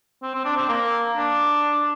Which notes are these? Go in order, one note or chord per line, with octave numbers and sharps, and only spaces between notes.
C4
C4
D4
C4
A#3
D4